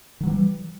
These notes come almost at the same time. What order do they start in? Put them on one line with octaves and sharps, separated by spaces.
D#3 F#3 E3 G3